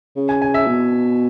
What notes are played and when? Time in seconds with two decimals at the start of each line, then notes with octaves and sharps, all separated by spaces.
0.16 C#3
0.29 G#5
0.42 G#5
0.54 E5
0.67 B2